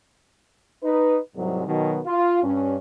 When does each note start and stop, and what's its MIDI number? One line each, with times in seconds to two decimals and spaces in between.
0.83 1.18 63
0.83 1.18 71
1.36 1.65 36
1.36 1.65 44
1.36 1.65 54
1.67 1.99 47
1.67 1.99 51
1.67 1.99 54
2.06 2.42 65
2.43 2.77 43
2.43 2.77 61